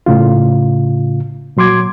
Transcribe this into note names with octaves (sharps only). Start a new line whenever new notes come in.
A2 C#3 F4
A#2 F#3 C6 D6 G#6